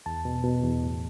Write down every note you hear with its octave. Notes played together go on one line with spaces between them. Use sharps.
E2 A5
B2
B2
E2
A2